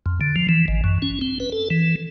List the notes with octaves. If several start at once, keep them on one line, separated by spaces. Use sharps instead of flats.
F2
D3
F3
E3
G#1
F#2
C#4
C4
B4
A4
E3